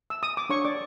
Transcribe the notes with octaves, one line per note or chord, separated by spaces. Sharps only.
E6
D#6
D6
D4 C#5 C#6
D5 D6